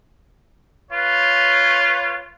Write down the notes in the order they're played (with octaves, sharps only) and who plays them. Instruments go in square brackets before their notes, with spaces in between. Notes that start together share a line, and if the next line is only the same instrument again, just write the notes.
[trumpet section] F4 B4 C#5